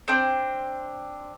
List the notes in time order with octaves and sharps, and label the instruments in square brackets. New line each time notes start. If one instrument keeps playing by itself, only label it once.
[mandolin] C4 D4 C5 G5